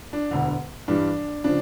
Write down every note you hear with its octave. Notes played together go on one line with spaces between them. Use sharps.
D4
E1 D2 D3
G2 E3 G3 D4
C#3 F3 D4